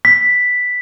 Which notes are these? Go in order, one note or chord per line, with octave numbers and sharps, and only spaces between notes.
B6